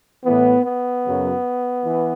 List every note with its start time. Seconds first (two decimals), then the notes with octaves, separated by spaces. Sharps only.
0.24 A2 E3 B3
0.64 B3
1.04 F#2 C#3 F#3
1.84 E3